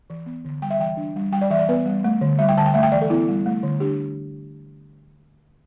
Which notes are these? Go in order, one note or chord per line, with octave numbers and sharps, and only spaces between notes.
E3
B3
D3
G3 G5
E5
E3 G5
D4
G3
G3 G5
D5
E3 E5
D5
B3 B4
G3
A3
D3
G3 E5
G5
D3 A5
G5
A3 E5
G5
E3 D5
A4
B3 E4
G3
A3
D3
D4 G4